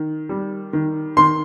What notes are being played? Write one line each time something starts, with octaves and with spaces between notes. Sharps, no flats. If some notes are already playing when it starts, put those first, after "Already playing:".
Already playing: D#3
G3
D#3
D#3 C6